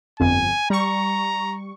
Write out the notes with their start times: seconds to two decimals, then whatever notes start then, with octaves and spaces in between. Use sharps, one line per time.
0.20 G1 F2 G#5
0.70 G3 A#5 C#6